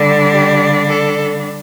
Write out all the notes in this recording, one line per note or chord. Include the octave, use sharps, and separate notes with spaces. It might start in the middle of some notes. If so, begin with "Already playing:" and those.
Already playing: D3 G3 D4
G4
A4